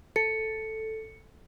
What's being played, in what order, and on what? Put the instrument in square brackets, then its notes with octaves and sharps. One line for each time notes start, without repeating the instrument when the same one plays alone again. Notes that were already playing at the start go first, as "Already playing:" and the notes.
[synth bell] A4 [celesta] C#7